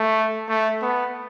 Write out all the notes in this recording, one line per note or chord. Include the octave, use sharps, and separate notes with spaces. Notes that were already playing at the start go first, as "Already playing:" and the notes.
Already playing: A3
A3
B3